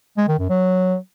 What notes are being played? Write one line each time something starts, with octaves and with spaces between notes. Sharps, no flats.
G#3
D#3
F#2
F#3